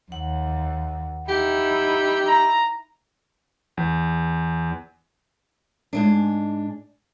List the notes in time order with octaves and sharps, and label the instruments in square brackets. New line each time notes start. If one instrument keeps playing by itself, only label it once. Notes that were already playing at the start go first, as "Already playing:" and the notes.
[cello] D#2 [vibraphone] F#5
[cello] D#4 E4 [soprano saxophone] G4
[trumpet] A#5
[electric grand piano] E2
[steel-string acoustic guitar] G#2 G#3 D4